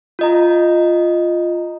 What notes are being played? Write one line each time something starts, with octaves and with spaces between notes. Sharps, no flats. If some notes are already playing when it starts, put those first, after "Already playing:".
F4 D#5 A#5